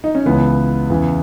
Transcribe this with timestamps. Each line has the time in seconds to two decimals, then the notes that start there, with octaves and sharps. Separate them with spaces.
0.04 D#4
0.15 C#4
0.26 C#2 C#3 E3 B3
0.90 E2 C#3 E3